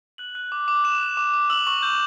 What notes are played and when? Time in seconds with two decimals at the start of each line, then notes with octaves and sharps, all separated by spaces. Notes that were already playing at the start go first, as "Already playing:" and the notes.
0.18 F#6 F#7
0.35 F#6
0.52 D6
0.68 D6
0.84 F#6 E7
1.01 F#6
1.17 D6
1.33 D6
1.50 E6 F#7
1.67 C#6 F#7
1.83 G6